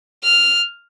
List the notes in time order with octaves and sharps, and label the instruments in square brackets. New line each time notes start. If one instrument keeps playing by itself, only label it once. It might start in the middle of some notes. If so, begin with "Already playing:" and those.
[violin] F6